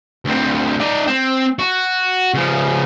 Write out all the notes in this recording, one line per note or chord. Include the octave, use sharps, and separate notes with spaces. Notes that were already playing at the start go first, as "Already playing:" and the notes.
D2 C4
D#4 D5
C4
F#4
C#3 F3